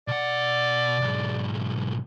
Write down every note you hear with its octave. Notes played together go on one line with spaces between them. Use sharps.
B2 D5 F#5
B1 G#2